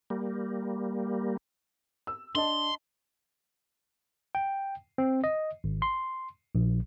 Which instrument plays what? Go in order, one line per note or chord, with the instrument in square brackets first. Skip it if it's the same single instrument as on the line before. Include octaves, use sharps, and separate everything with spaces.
[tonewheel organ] G3 A#3
[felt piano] E6
[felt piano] D4 D#5 A5 [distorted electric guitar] C6
[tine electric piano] G5
C4
D#5
G#1
C6
A#1